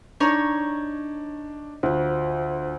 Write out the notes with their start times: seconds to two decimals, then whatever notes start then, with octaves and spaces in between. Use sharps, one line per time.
0.20 D4 D#4 C#5 C#6
1.83 D2 F4 C5